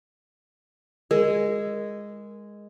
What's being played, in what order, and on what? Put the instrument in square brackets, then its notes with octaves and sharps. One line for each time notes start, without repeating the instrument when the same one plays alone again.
[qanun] G#3 [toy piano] A#4